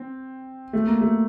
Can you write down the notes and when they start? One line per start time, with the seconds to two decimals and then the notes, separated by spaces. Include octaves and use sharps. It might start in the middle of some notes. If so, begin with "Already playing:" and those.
Already playing: C4
0.73 A3
0.87 A#3
1.01 A3